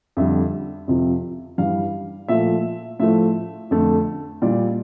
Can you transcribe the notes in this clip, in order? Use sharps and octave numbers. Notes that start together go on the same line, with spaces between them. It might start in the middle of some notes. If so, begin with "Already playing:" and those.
F2 D3 G3 E5
F2 C3 F3
G2 E3 G3 F5
A#2 F3 A3 E5
A2 F3 A3 E5
F2 D3 A3
A#2 G3 D5